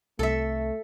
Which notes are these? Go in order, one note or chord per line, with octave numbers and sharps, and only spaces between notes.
C2 A3 A4 E5